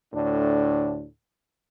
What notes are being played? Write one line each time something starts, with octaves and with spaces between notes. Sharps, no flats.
D2 A2 D4